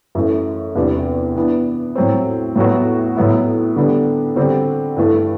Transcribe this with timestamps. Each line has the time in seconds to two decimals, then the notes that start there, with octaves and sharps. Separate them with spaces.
0.15 F#2 E3 A3
0.75 E2 C3 G3 D4
1.36 E3 B3 D4
1.95 A2 F#3 C4
2.56 A2 F#3 B3 F#4
3.16 A2 F#3 B3 E4
3.76 D3 G3 B3 D4
4.36 D3 G3 C4 F#4
4.96 G2 E3 A3